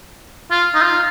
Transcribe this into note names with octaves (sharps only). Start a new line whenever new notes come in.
F4
D#4
F4